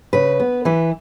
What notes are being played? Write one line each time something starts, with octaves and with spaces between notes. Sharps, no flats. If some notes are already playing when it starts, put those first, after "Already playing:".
C#3 B4
B3
E3 B4